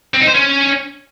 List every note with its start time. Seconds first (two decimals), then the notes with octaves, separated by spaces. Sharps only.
0.14 C4
0.21 D#4
0.28 C5
0.34 C#4